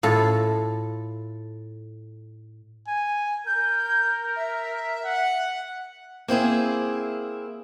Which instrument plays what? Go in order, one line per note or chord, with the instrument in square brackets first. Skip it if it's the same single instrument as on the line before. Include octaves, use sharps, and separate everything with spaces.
[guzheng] A2 F4 A4
[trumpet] G#5
[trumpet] A#4 [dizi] G6
[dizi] E5
[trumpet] F#5
[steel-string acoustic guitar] A#3 C4 E4 G#4